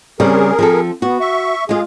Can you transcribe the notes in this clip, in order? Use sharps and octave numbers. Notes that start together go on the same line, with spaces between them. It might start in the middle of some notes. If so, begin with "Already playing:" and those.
C#3 G3 C4 G#4 A#4
F3 C4 A4
B3 F#4
E5 C#6
G#3 F4 G#4